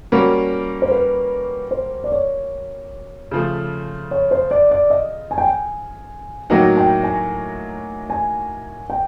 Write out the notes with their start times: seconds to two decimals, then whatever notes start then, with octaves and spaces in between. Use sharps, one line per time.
0.12 G3 A#3 C#4 F#4 A#4
0.82 C5
0.91 B4
1.71 C5
2.04 D5
2.12 C#5
3.31 C#3 F3 A3
4.11 C#5
4.31 C5
4.51 D5
4.71 D5
4.90 D#5
5.31 G#5
5.38 G5
5.45 G#5
6.50 A2 F#3 A#3 D#4 F#4 G5
6.77 G5
7.03 G#5
8.10 G#5
8.90 G5